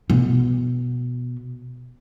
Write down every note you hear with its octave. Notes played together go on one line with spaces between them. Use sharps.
B2 B3